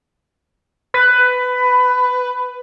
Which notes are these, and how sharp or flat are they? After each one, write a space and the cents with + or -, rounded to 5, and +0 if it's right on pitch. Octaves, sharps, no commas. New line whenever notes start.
B4 +15